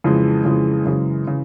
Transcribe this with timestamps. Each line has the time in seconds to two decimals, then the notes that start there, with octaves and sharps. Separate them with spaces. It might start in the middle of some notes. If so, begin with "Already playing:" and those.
0.04 F2 C#3 E3 G#3
0.45 F2 C#3 E3 G#3
0.85 F#2 C#3 E3 G#3
1.27 C#3 E3